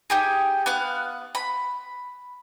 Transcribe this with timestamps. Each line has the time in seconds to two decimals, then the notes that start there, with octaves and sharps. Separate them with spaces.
0.10 D#4 G4 G#4
0.66 B3 F5 F#6
1.35 B5